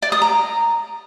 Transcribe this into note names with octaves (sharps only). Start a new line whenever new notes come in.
D5
D#6
A#5